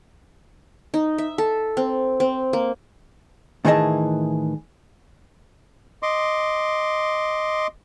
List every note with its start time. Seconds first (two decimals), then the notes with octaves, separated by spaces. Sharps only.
0.94 D#4
1.18 E5
1.38 A4
1.77 C4
2.20 C4
2.53 A#3
3.65 A2 D#3 E3 G#4 D#5 A5
6.03 D#5 C6 D6